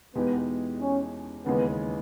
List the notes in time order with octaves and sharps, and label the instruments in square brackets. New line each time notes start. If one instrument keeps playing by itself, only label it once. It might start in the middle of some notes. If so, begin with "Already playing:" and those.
[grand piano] E2 B2 G#3 D#4 G4 [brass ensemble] B3
[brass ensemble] C#4
[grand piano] D#2 C#3 E3 G#3 [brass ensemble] B3